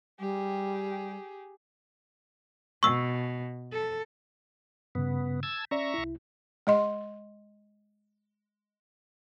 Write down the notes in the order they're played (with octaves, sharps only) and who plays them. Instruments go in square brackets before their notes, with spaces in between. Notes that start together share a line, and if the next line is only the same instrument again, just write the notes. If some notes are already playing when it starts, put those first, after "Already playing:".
[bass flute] G3 [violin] G4 G#4
[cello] B2 [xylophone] C#6 E6
[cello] A4
[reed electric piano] G2 C#3 [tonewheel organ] B3
[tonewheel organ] A5 E6 G#6
[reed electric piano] C#4 D5 [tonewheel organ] E5 A#5 C#6
[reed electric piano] C2 E4
[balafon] G#3 D#5 C6